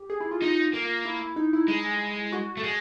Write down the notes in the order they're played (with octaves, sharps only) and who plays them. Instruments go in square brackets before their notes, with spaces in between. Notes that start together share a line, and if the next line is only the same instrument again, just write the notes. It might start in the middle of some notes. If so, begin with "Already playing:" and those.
Already playing: [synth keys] G4
G#4
E4
F4
[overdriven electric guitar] D#4
A#3
[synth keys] E4
E4
D#4
E4
[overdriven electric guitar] G#3
[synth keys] F#4
[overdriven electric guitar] A3
G#3